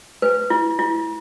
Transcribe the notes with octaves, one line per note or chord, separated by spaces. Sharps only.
B4
E4
E4